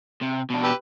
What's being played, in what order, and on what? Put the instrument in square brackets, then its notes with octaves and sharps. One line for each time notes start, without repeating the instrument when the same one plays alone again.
[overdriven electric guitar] C3
B2 D4
[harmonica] G4 B4 E6